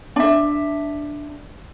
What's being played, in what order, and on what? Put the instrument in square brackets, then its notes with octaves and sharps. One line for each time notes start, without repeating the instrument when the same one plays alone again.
[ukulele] D4 E5